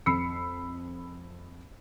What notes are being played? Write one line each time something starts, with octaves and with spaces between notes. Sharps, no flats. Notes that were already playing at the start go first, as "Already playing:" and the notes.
F2 B5 E6 C7 C#7